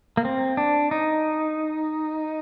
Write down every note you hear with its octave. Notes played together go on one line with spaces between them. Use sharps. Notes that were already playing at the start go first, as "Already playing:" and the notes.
A#3
C4
D4
D#4